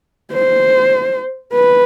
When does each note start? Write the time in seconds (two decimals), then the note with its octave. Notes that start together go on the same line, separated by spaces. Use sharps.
0.32 C5
1.53 B4